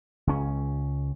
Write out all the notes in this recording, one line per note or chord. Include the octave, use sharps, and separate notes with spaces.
C#2 C#4